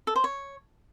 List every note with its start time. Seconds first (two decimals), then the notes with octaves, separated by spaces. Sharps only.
0.07 A4
0.16 C5
0.24 C#5